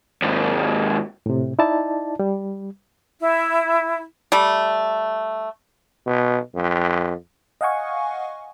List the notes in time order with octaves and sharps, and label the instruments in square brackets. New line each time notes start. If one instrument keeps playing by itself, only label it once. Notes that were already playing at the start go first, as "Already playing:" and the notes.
[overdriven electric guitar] D#2 G#2
[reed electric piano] A2 C3
D#4 E4 D5 A5
G3
[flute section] E4
[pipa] G3 A3
[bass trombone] B2
F2
[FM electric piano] D#5 F5 F#5 G#5 C#6